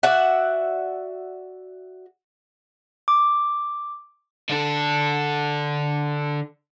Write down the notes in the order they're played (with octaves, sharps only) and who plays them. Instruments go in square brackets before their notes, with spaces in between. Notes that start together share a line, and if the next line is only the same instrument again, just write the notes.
[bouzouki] F#4 D5 E5 F#5
[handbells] D6
[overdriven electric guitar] D3 A4